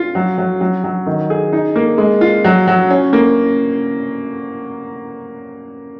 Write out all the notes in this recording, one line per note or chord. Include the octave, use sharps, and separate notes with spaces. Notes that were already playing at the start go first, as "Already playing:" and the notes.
Already playing: F4
F#3
F#3
F#3
F#3
D#3
G#4
D#4
A#3
G#3
F4
F#3
F#3
C#4
A#3